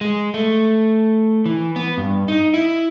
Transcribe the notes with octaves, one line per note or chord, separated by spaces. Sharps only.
G#3
A3
E3
B3
G2
D#4
E4